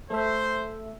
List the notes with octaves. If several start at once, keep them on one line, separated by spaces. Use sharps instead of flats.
A3 C5 E5